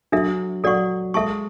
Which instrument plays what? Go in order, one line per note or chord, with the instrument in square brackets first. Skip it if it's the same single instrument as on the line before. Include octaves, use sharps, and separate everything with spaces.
[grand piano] F#3 [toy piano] D4 A4 E5
[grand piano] F#3 [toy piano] A4 D5 F#5 C#6
[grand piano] G#3 [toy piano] A4 E5 A5 C#6